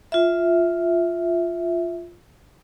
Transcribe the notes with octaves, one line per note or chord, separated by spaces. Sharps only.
F4 E5